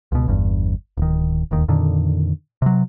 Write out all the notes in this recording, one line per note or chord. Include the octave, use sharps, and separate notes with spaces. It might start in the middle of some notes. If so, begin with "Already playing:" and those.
C#2 B2
G1 E2 G2
D1 D#3
D1 D#2 D#3
F2 A#2 D3 D#3
C3 F#3